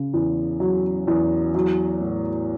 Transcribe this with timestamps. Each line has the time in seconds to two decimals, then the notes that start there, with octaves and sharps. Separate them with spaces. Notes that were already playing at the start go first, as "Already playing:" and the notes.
Already playing: C#3
0.14 E2
0.60 F#3
1.07 E2
1.55 F#3
2.01 A2